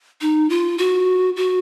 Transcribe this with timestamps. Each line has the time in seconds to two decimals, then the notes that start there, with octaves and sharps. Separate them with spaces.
0.21 D#4
0.50 F4
0.78 F#4
1.36 F#4